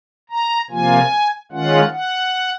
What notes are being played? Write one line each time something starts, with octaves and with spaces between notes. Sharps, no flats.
A#5
C3 F3 A#3 F4 G#5
D#3 G#3 C#4 F4 F#5
F#5